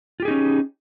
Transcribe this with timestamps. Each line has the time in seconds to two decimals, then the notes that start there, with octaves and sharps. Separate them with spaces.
0.20 F4
0.22 G4
0.25 G#4
0.28 D#4
0.31 C#4